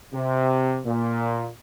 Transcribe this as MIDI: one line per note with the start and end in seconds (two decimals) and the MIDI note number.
0.13 0.79 48
0.86 1.47 46